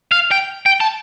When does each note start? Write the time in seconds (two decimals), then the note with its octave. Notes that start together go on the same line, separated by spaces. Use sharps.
0.12 F5
0.31 G5
0.66 G5
0.81 A5